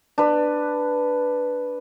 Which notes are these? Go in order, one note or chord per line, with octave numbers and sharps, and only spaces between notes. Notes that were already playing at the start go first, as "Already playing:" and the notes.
D4 B4